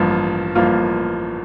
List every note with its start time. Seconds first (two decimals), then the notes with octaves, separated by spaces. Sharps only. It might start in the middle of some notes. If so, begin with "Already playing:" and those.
Already playing: A1 G2 F3 A#3 F4
0.55 A1 G2 F3 A#3 F4